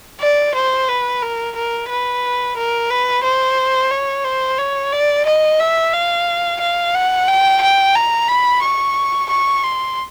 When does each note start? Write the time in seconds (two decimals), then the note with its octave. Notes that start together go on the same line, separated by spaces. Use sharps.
0.21 D5
0.55 C5
0.88 B4
1.22 A#4
1.56 A#4
1.89 B4
2.57 A#4
2.90 B4
3.23 C5
3.91 C#5
4.25 C5
4.58 C#5
4.92 D5
5.26 D#5
5.60 E5
5.93 F5
6.60 F5
6.95 F#5
7.28 G5
7.62 G5
7.95 A#5
8.29 B5
8.62 C#6
9.29 C#6
9.63 C6